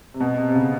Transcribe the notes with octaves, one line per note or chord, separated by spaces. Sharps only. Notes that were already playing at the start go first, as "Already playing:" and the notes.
C3
B2
C3
C3
C#3